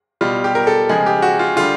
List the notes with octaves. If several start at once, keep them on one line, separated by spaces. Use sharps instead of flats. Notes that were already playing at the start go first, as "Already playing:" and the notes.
B2 G3 F4
G4
A#4
A4
C#3 F3 G#3 G#4
G4
F#4
F4
D3 G3 F4